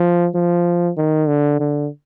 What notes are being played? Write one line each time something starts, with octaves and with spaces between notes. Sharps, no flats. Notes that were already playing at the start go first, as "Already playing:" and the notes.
Already playing: F3
F3
D#3
D3
D3